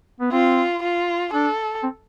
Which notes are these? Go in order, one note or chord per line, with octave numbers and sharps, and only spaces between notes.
B3
C4 F4
F4
D4 A4
C4